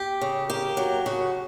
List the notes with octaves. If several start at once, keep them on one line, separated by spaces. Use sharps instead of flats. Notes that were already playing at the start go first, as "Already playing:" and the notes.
Already playing: G4
C#3
A#3 G4
F#3
C#3 F#4